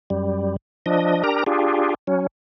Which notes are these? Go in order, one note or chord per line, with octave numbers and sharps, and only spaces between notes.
F#2 G3
F3 D4 D#5
D4 G4 A#4 A#5
D4 F4 G4 G#4
F#3 C#4